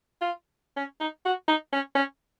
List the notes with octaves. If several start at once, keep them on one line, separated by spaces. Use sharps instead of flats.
F4
C#4
D#4
F#4
D#4
C#4
C#4